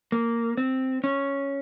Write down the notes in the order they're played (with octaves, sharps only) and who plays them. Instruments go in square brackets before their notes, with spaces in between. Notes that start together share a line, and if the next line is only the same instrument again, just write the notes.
[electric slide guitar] A#3
C4
C#4